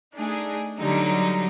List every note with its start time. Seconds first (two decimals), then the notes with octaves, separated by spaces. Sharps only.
0.15 A3 D4 D#4 G#4
0.78 D3 F#3 G3 D#4